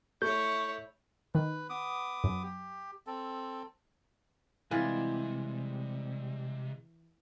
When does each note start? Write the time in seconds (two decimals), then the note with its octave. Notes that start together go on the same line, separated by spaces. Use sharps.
0.22 A3 E4 C#5 C#6 G6
1.35 D#3 B4
1.70 B3 D6 D#6
2.24 F#2
2.43 G4
3.07 C4 A4
4.71 C3 E3 G3 G#3 F4